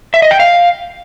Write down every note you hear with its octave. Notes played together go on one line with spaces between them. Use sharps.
E5
D#5
G5
F5